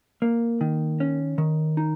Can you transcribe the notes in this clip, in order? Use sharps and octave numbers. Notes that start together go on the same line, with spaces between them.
A#3
D#3
C#4
D#3
D#4